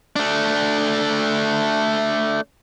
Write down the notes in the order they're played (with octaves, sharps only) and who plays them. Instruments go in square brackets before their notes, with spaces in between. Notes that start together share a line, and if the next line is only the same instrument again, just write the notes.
[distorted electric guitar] A3 D4